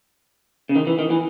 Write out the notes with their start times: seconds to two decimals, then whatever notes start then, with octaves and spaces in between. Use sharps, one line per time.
0.69 C#3
0.76 D#3
0.87 E3
0.99 D#3
1.11 E3